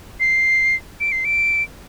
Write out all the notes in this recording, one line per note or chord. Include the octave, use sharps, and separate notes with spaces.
C7
D7
C7
D7